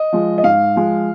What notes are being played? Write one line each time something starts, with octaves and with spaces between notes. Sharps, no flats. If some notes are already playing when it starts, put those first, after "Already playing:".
Already playing: D#5
F3 G#3
D#5
G#2 F5
F3 G#3